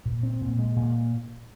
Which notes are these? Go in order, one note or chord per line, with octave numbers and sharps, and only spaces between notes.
A#2
C4
A#2
G#3
A#2